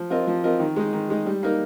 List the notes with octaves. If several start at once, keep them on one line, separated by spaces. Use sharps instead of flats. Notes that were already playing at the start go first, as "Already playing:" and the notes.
Already playing: F3
C4 F4 A#4 D#5
F3
C4 F4 A#4 D#5
D#3
G#3 D#4
D#3
G#3 D#4
G3
A#3 D#4 A#4